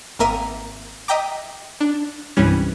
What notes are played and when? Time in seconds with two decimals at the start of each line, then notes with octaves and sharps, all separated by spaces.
0.19 G#1 A#3 A#4 E5 D#7
1.08 D#5 E5 G5 A#5 D6
1.81 D4
2.37 C2 G2 E3 G3 C#4